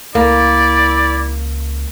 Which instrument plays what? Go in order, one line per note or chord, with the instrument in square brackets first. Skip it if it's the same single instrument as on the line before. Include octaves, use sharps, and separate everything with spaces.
[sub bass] C#2 [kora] A#3 [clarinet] E4 [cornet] D5